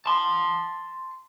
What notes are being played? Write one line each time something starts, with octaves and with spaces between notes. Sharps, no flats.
A5 C6